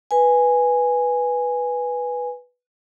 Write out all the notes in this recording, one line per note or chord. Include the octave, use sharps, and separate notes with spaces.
B4 G#5